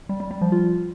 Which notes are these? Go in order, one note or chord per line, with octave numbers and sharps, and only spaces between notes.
G3
G3
G3
F3
F4